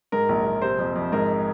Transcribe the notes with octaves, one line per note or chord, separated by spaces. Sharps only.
G#2 A#4
A#1
A#1
C3 C5
F2
F2
G#2 A#4